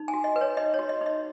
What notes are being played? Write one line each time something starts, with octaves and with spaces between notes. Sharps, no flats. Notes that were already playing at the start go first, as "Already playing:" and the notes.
Already playing: D#4
G#5
F#4
D#5
B4
C#5
D#4 D#5
C#5
F#4
D#5
D#4 D#5